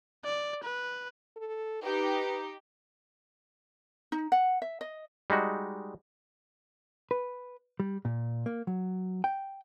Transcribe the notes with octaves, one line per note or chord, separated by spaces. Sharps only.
D5
B4
A4
D#4 G4 B4
D#4
F#5
E5
D#5
G3 G#3 D#4 F#4
B4
G3
A#2
A#3
F#3
G5